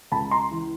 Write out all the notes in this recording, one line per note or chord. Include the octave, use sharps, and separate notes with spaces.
C#2 A5 B5
A#5 C6
E3